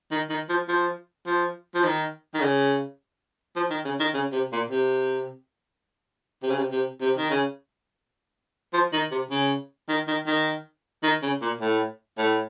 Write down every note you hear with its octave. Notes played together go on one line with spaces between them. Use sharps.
D#3
D#3
F3
F3
F3
F3
D#3
D#3
C#3
F3
D#3
C#3
D#3
C#3
C3
A#2
C3
C3
C#3
C3
C3
C3
D#3
C#3
F3
D#3
C3
C#3
D#3
D#3
D#3
D#3
C#3
A#2
A2
A2